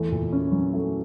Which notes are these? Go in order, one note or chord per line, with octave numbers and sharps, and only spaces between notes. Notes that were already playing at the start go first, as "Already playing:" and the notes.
Already playing: E2 A3
A#2
C#4
F#3
A3